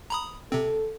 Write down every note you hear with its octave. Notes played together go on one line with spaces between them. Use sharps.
A#5 B5 D#6
C3 C4 A4